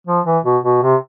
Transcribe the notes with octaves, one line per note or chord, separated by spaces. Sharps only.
F3
E3
B2
B2
C3